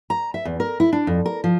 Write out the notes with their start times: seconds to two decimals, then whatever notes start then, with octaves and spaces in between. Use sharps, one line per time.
0.10 A#5
0.34 E5
0.45 E2
0.60 A#4
0.80 E4
0.93 D4
1.07 F2
1.26 A#4
1.44 F3